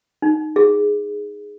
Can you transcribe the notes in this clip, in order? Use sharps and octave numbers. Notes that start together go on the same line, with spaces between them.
D#4
G#4